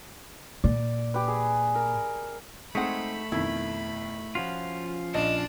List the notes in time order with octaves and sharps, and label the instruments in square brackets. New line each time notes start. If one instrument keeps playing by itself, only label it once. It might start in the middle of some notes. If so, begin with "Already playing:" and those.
[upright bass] A#2 [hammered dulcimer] D5
[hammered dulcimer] G4 B4
G#4
A#4
[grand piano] G#3 C4 G#4 [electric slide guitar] A3 [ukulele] D#4 F#5 [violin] B5
[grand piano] F2 B2 D#3 [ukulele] E4
[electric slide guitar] F3 C#4 F4 [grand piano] F#4
[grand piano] A#1 [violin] D4 A5 [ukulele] D#5